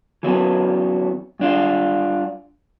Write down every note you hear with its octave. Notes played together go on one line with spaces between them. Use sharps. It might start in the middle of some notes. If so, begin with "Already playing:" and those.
E3 F#3 B3 C#4
G2 D4 F4